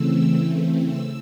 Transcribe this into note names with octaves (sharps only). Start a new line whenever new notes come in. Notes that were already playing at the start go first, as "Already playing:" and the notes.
Already playing: C#3 E3 A3 C4 E6
E6